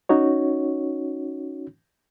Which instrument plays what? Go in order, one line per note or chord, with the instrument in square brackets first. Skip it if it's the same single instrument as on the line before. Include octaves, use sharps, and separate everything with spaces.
[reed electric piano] C#4 D#4 F#4 C#5